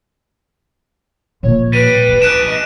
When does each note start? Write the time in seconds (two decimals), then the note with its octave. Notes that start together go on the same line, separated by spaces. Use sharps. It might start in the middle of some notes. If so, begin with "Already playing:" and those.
1.43 A#2 F3 C#5
1.73 G3 B4 D#7
2.09 G#3
2.22 D4 G#4 F#6 D7 E7
2.47 D#5